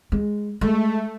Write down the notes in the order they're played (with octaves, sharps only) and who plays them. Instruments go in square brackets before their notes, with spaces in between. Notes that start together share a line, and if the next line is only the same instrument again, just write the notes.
[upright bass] G#3
[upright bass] G#3 [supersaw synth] A3